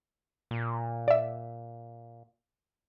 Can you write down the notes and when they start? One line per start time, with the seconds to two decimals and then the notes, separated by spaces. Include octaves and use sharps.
0.51 A#2
1.08 D5 E5